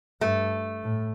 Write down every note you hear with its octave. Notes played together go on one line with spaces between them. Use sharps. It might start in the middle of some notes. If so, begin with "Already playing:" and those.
G2 A3
A2